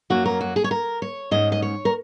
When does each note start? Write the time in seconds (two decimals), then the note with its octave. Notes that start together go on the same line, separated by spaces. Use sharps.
0.10 F#2 F#3 A#3 C#4 F#4
0.26 A#4
0.41 F#4
0.56 G#4
0.64 C#5
0.71 A#4
1.02 C#5
1.31 G#2 G#3 C#4 D#5
1.52 D#5
1.62 C#5
1.85 A#4